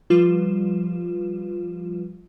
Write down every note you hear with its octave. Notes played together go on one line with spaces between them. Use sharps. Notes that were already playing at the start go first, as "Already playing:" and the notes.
F3 G3 F4 B4 E7